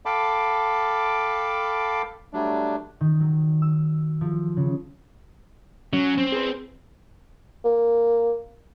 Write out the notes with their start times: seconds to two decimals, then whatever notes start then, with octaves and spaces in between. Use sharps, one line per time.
0.06 A4 F5 G5 A5 B5 D6
2.33 F#3 G3 A3 D4
3.01 D#3
3.20 F#3
3.62 E6
4.21 F3
4.57 C#3
5.93 F#3 C#4
6.18 C4
6.32 G#4 B4
7.65 A#3